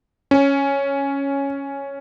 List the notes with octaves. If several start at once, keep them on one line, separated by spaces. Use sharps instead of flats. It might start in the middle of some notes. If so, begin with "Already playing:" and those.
C#4